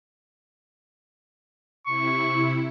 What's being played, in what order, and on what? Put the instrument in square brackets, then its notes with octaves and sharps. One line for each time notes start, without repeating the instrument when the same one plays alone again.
[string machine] C3 E4 [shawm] C#6